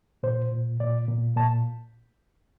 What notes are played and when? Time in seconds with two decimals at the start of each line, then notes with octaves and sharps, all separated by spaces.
0.23 A#2 C5
0.52 A#2
0.80 A#2 D5
1.08 A#2
1.37 A#2 A5